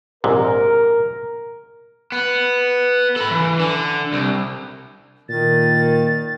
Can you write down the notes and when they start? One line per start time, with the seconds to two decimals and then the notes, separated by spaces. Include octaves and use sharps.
0.24 A#1 G#2 C3 A#4
2.12 B3
3.16 A4 B5
3.31 E3
3.59 D3
4.13 C2
5.29 A#2 D#3 A6